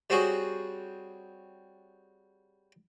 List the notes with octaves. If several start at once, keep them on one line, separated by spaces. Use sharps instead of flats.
G3 C4 F#4 G#4 C#5